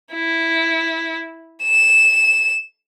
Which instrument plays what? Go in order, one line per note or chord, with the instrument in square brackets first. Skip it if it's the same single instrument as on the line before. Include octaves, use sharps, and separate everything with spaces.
[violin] E4
E7